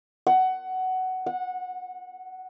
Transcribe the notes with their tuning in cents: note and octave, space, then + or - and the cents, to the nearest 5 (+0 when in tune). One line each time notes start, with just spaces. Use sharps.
F#5 +15
F#5 -20